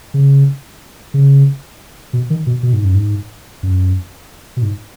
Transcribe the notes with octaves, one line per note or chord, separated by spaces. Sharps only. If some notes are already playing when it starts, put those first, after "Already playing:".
C#3
C#3
B2
D#3
B2
B2
G#2
F#2
G#2
F#2
B2
G#2